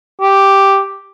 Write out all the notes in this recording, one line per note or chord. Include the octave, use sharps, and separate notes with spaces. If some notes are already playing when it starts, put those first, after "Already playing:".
G4